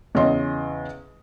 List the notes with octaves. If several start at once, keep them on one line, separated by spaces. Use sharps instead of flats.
E2 C#3 C#5 D#5 C6